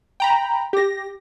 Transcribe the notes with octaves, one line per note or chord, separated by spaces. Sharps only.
G5 A#5 B5
G4 A#6